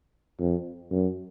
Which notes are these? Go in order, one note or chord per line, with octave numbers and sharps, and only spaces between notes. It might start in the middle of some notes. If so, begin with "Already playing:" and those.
F2
F#2